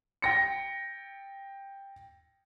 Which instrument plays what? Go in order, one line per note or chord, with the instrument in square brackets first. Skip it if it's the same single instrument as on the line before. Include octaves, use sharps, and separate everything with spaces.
[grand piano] G5 A#6 C#7